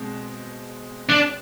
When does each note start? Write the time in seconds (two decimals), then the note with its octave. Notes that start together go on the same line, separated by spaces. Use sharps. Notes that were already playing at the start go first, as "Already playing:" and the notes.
Already playing: B2 G#3 C4
1.10 D4